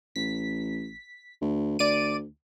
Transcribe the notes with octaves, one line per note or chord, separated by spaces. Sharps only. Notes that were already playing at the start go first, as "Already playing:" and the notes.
A1 B6
D2
D2 D5 D7 D#7